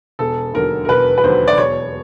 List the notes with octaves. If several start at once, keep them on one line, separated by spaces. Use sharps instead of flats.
E1 A4
D#2 D3 F#3 A#4
A#4
E1 B4
B4
D#2 D3 F#3 C5
D5
E1 C#5